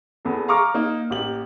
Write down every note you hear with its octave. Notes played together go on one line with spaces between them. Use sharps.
E2 B3 A4
F5 A#5 C#6 D6 F6
A#3 D#4
A1 A#3 G4 F#7